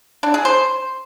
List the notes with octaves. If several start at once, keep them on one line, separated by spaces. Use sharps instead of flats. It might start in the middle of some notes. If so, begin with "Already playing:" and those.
D4
G#4
C5